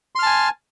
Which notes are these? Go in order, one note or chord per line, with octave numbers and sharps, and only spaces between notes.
G#5 A5 C6 F6